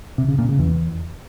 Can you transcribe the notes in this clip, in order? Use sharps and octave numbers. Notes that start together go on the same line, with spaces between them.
C3
C#3
A#2
C#3
E2